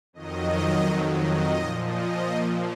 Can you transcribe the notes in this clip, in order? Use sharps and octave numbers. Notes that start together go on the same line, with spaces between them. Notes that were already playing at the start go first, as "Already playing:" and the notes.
F2 D#3 F#3 D#5
D#5
A#2 F3
D#5